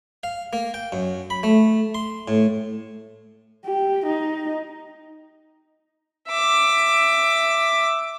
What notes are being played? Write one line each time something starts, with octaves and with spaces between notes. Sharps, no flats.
F5
A#3
G5
F#2
B5
A3
C6
A2
G4
D#4
E5 D6